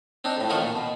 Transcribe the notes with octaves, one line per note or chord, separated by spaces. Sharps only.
C4 D4 D#4
F2 A2
D3 D#3 F3 F4 C#6 D#6
A#2
B2